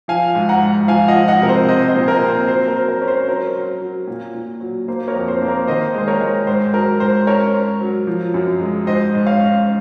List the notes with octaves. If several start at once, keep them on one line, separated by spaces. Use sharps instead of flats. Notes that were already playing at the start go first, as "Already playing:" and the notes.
F3 F5 G#5
G#2
F#5 A#5
G#2
F3 F5 G#5
D#5 F#5
F3
D#5 F#5
C3 A#4
C5
C4 C5 D#5
C5 D#5
A#2
A#4
C4
C5
F#3 C5
A#4
F#3
A#4
C#4
C5
F#3 A#4
F#3
F#3
A#2
A#2
F#3
A#3 C5
A#4 C#5
F2
C5
A#3
A#4
D#3 C5 D#5
G#3 C5
A#4 C#5
G#3
G#2 C5
F#3 A#4
G#2 C5
C#4 A#4 C#5
C#4
F#3
F3
F#2
G#3
G#2 C5 D#5
G#2
C#5 F5
C#4